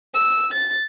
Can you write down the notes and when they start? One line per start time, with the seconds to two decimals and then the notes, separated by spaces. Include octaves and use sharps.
0.15 E6
0.53 A6